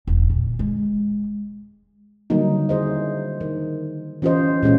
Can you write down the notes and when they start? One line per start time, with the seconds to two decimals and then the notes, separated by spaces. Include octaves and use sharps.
0.07 E1
0.30 A#2
0.59 G#3
2.30 D3 D#3 F#3 G3 A#3 D#4
2.69 E4 G#4 C5 D#5
3.41 D#3
4.22 E3 C#4 F4 G4 C5 D#5
4.63 A#2 G#3 C#4 F4